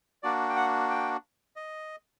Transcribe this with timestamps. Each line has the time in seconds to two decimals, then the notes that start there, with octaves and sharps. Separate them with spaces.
0.23 A#3 D4 F#4 D5
0.50 G5
0.56 F#5
0.90 G5
1.56 D#5